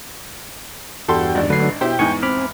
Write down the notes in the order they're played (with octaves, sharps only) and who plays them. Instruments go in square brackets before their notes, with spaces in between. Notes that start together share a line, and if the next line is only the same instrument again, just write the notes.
[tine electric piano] E2 G2 G3 [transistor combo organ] F#4 G5 [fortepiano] A4 C6
[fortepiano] G#1 D4
[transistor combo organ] D3 F#3 A3 [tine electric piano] B4 C7
[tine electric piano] B2 [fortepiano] E4 G4 C5 [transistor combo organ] G5
[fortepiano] E2 G#2 [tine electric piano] G#5 C#6
[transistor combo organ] C4 [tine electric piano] B5 D6 F6